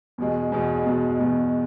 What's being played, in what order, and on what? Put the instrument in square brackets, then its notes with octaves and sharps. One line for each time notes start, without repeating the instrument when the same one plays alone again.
[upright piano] E2 B2 G#3
E2 B2 G#3
E2 B2 G#3
E2 B2 G#3